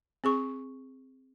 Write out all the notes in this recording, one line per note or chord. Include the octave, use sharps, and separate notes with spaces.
C4 G#4 C#6